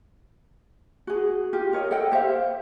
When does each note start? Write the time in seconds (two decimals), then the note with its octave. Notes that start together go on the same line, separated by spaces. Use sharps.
1.07 F#4 G#4
1.53 F4 G4
1.73 A#4 C#5 D#5
1.91 A4 D#5 F#5 G5
2.11 G4 C5 E5 F5